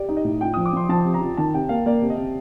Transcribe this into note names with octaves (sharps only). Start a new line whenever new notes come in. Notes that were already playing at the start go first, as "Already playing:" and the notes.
Already playing: G4 D5
D#4
D#5
A2
F4 G5
F3 D#6
D6
F3 C6
F3 A5
C3
A#5
F4
D#3 A5
C3 G5
A#3 F5
A#3 D5
C3
D#5
C3